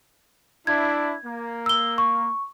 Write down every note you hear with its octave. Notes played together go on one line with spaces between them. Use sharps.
D4 E4 G#6
A#3
E6 G7
C#6